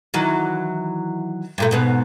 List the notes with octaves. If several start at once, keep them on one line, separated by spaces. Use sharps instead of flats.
D#3 E3 F#3
G2 A#2 A3
G#2 B2 B3